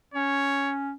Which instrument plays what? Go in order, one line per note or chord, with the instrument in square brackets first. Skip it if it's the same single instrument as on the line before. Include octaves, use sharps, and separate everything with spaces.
[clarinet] C#4 [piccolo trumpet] C#5